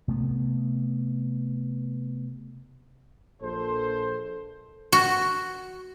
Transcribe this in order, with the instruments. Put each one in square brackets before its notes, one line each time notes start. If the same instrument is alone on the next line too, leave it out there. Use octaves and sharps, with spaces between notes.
[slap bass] C3 A3 B3
[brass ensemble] A#1 A4 C5
[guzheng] F#4